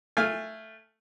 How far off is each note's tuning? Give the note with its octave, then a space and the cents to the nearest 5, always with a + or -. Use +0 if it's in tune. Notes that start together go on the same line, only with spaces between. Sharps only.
A3 +0 F5 +0 G#5 -20